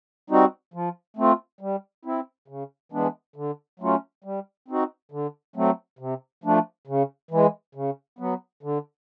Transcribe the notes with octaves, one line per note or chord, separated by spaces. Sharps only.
G3 C4 D#4 F#4
F3
A3 C4 F4
G3
C4 E4
C#3
E3 G#3 B3 D4
D3
F#3 A3 C#4 F4
G3
C4 D#4 F#4
D3
F#3 A3 C4
C3
F3 A3 D4
C#3
E3 G#3
C#3
F#3 B3
D3